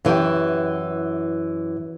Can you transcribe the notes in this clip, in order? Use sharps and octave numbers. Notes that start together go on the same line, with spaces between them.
F#2 E3 E4 G4 G5